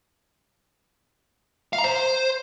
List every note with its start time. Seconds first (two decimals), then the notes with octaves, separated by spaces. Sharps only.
1.73 F5
1.78 A#5
1.84 C5